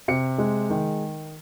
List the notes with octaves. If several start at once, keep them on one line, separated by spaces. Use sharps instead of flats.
C3 C#7
G#3
D#3